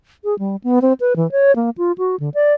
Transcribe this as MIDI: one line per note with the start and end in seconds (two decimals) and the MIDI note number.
0.24 0.37 68
0.39 0.56 55
0.64 0.79 59
0.82 0.93 60
1.00 1.16 71
1.16 1.30 52
1.32 1.54 73
1.56 1.70 58
1.78 1.92 65
1.98 2.16 66
2.20 2.30 50
2.34 2.54 74